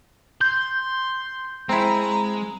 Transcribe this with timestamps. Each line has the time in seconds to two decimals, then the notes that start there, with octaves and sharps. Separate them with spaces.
0.41 C6 G6
1.69 G#3 C4 E4 A#5